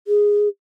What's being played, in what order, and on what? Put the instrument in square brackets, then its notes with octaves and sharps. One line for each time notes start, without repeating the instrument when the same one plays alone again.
[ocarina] G#4